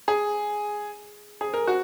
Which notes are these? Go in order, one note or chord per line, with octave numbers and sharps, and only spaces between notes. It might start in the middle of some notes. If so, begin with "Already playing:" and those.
G#4
G#4
A#4
F#4